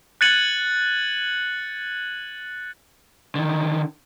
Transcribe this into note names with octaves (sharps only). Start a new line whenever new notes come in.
F#6 G#6 A6 C#7 D#7 F#7
D3 D#3